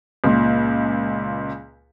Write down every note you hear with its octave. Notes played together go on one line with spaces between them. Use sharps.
C#2 A#2